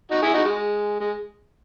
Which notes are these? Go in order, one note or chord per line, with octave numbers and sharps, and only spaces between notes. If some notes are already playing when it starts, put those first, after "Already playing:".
D#4 F#4
E4 G#4
D#4 F#4
G#3
G#3